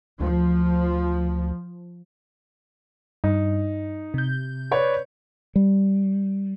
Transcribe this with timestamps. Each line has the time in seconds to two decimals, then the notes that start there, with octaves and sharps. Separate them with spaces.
0.20 D2 F3
3.24 G2 D#4
4.14 C3 G6
4.71 B4 C#5 D5
5.56 G3